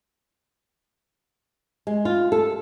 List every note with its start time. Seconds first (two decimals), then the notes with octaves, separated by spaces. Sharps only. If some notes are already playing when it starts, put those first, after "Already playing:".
1.87 G#3
2.05 F4
2.32 A4